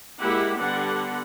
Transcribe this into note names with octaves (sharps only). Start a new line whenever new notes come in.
G#3 A#3 E4 G4 F#5
D3 G3 B3 F#5